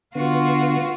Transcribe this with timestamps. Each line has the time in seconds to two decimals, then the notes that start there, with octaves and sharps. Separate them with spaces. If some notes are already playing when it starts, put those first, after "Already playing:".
0.15 D3 B3 F4 F#4